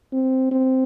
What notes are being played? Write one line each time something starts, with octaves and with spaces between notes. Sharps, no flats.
C4
C4